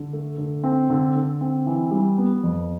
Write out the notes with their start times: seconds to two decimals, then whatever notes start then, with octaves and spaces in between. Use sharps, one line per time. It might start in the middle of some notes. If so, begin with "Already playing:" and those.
Already playing: D3
0.13 A3
0.38 D3
0.64 C4
0.90 D3
1.15 D3
1.41 C4
1.66 E3
1.91 G3
2.18 B3
2.44 F2